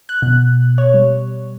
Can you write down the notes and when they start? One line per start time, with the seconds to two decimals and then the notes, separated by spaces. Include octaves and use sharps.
0.09 F#6
0.22 B2
0.78 C#5
0.94 G3